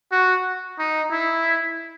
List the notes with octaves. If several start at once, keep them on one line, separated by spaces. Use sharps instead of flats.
F#4
D#4
E4